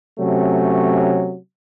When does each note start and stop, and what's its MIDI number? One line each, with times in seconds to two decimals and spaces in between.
0.19 1.36 48
0.19 1.36 54
0.19 1.36 57
0.19 1.36 61